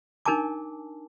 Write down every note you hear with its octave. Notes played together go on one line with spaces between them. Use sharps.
D4 D#4 A#4 G#5 A5 D6